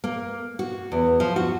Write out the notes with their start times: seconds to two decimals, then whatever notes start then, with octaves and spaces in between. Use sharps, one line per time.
0.04 A#3
0.59 F#4
0.92 E2
1.20 F3
1.36 F#4